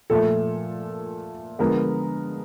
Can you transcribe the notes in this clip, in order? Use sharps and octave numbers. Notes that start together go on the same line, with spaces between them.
A#2 F3 A3 A4
D3 F3 G#3 B3 A#4